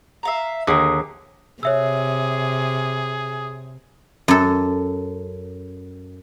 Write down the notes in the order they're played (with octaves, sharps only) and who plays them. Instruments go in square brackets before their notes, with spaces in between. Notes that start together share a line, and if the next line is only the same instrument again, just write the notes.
[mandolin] E5 F5 A#5
[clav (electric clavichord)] D#2 D3 [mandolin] G#4 A#4
[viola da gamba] C3 [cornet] G#4 [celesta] C#5 E5 E6
[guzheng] F#2 A4